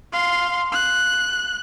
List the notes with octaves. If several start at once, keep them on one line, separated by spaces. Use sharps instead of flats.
F5 C6
F#6